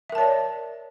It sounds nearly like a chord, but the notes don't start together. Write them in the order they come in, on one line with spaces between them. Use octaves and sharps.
E5 A#4 A5 C#5 D5